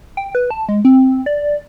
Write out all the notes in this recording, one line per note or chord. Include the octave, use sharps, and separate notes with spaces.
G5
B4
A5
G#3
C4
D5